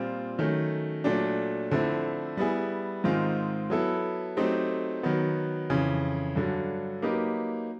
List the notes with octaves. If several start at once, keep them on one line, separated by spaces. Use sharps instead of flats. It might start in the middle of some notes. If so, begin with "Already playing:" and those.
Already playing: A#2 G3 C4 F4
D#3 F#3 A3 C#4
A#2 F#3 A3 D4
D3 F3 A3 C4 E4
G3 B3 E4 G#4
G#2 D#3 G#3 C4 F4
F#3 B3 E4 A4
F#3 A3 C4 D#4 G4
D#3 F#3 B3
F2 C#3 E3
G2 D3 F#3
F#3 A#3 D#4 G4 B4